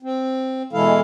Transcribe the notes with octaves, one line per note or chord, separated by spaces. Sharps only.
C4
B2 E3 G#3 E4 A4 F5